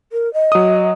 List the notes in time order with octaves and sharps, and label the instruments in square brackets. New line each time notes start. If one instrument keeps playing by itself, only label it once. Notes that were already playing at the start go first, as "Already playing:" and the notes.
[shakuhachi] A#4
D#5
[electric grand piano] F#3 D#6